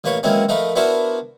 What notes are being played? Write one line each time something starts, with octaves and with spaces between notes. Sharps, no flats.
A1 A#3 B4 C#5
E3 F#3 G#3 A#3 C4 C#4
F3 A3 D#4 A#4 B4
B3 D4 E4 F#4 A#4 C5